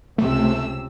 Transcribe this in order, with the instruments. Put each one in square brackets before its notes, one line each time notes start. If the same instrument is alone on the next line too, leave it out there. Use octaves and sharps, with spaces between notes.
[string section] C#2 C3 E6 [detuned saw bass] A3